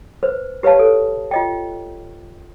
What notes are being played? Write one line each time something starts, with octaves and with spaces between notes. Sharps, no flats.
B4 C5
G4 B4 C#5 F5 A5
A4
F4 D#5 G5